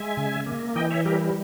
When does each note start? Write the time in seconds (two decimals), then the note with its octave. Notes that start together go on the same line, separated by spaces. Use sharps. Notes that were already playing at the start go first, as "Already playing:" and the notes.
Already playing: G#3 E5 G#5
0.17 C#3
0.46 A#3
0.76 E3 D#5 G5
0.90 C#5 E5
1.05 G3 G4 A#4